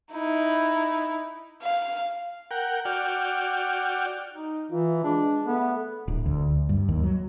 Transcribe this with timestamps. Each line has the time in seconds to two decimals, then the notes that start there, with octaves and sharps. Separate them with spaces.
0.12 D#4 E4
1.63 F5
2.51 A#4 F#5 G5
2.85 F#4 D5 G5 F6
4.33 D#4
4.72 E3 F4
5.04 G#3 D4
5.46 A3 B3
6.08 D1
6.26 D2
6.69 G2
6.89 D#2
7.03 F#3